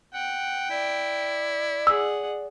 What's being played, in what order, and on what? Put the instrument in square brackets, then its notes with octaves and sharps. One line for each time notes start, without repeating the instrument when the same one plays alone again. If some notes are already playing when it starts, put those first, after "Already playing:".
[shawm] F#5 [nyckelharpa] G5
[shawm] E4 [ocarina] D5
[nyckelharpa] G#4 F#5 [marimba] E6